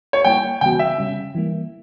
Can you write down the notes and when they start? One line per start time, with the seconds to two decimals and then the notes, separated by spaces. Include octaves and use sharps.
0.13 C#5
0.25 G3 A#3 E4 G5
0.61 C#3 E3 G3 B3 F#4 G5
0.79 E5
0.98 C#3 G3 C#4
1.35 E3 G3 A#3